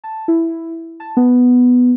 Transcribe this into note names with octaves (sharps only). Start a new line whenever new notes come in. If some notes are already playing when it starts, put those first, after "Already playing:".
A5
E4
A5
B3